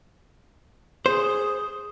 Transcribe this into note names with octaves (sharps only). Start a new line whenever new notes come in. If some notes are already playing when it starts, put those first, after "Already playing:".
G#4 C5